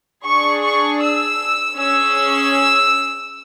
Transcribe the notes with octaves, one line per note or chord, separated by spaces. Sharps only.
D4 G#4 C#6
C#6
E6
C#4 G#4 E6